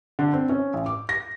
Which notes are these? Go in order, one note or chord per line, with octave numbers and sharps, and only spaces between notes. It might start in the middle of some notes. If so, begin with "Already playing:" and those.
D3
C4
C#4
A1
D6
A#6